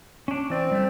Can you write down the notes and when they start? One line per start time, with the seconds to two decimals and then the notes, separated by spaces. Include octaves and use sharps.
0.28 C#4 D4
0.50 E3 C4 D5
0.72 G3 A3